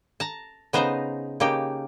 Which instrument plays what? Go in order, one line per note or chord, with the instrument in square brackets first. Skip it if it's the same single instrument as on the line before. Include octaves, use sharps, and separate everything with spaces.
[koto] A5 A#5
C#3 B3 D#4 C5 D#5 A#5
C#3 A#3 D#4 G4 G5